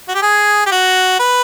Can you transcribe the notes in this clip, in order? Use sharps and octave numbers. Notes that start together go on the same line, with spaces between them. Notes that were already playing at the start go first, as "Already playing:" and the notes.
F#4
G4
G#4
G4
F#4
B4